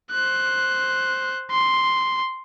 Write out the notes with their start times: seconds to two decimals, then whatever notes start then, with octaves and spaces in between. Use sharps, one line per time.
0.11 C5 F#6
1.51 C6